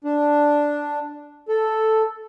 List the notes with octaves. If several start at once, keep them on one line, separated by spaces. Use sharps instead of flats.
D4
A4